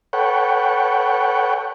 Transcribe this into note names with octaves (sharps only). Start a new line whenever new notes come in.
A4 B4 C#5 F#5 G5